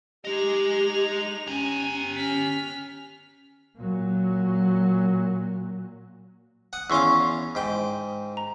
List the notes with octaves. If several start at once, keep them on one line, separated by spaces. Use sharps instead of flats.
G#3 D#4 G4 D#5 F7
C#4 G4 G#5 A#5
C#4 F6 B6
A#2 F#3
F#5 D#6
E2 C#4 F5 C6 C#6 E6
G#2 G5
A#5